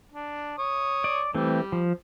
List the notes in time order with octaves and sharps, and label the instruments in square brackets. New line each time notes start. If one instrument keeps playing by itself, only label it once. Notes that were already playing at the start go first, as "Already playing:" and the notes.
[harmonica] D4
C#5 D#6
[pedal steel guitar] D5
[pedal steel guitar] E3 A3 C4 [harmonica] G3
[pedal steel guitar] F3